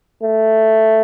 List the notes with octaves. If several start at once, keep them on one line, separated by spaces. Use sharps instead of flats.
A3